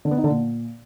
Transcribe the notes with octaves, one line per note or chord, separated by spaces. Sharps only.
D3
B3
D#4
D3
A#2